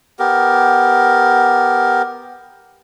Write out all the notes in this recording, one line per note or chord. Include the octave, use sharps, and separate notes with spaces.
B3 G4 A#4